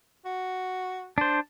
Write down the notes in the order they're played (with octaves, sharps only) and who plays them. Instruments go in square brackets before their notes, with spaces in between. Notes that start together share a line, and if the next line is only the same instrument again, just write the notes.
[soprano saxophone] F#4
[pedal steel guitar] D4 C5 [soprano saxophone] A5